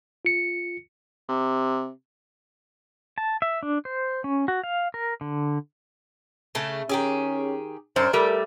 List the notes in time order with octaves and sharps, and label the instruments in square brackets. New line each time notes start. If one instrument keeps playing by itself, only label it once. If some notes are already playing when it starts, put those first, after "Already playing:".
[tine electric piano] F4 C#7
[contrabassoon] C3
[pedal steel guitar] A5
E5
D4
C5
C#4
F#4
F5
A#4
D3
[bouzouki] C#3 A3 A5
[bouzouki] D#3 G4 G#4 [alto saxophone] C#4
[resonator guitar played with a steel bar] F#2 [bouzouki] D4 [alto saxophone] C5
[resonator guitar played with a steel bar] G3 A3 [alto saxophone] A#4